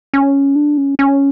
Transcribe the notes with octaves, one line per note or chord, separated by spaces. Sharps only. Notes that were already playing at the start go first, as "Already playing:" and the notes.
C#4
D4
C#4
C#4